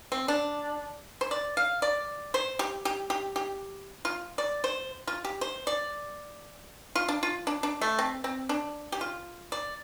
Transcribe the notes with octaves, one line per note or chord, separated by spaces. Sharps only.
C4
D4
C5
D5
F5
D5
C5
G4
G4
G4
G4
F4
D5
C5
F4
G4
C5
D5
F4
D4
F4
D4
D4
A3
C4
C4
D4
G4
F4
D5